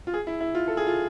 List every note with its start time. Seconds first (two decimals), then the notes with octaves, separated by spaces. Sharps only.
0.07 F4
0.14 G#4
0.27 E4
0.41 E4
0.55 F4
0.68 A4
0.77 G#4
0.87 F4